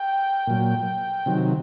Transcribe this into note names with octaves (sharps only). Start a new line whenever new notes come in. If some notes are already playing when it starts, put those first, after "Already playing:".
Already playing: G5
A#2 F#3
C3 D#3 F#3